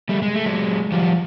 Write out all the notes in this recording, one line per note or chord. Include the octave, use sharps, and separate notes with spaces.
G3 A3
G#3
A3
F#3 G#3
F3 G3